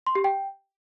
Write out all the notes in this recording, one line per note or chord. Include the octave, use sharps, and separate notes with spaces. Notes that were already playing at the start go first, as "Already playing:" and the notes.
C6
G4
G5